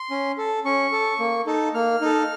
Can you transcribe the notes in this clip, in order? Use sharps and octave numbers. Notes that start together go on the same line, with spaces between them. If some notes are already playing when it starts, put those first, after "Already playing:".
Already playing: C6
C#4
A4
C#4 C#6
A4
A#3
D#4 A4
A#3 F6
D#4 A4